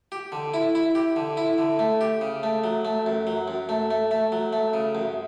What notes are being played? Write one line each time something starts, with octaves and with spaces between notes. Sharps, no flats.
G4
D3
E4
E4
G4
D3
E4
D3
A3
G4
C#3
A3
F#3
A3
F#2
F#3
F#2
A3
A3
A3
F#3
A3
C#3
F#2